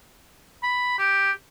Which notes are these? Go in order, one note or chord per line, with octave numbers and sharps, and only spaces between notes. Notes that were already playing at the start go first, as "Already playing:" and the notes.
B5
G4